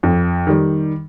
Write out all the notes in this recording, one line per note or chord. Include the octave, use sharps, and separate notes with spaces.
F2
D#3 G3